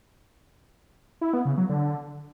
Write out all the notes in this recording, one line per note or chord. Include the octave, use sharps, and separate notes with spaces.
E4
B3
C#3
F#3
D3